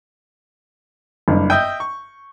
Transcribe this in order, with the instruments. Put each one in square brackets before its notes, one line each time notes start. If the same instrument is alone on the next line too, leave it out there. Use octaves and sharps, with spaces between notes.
[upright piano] F#1 G2
[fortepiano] D#5 E5 G5 [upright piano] G6
[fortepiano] C#6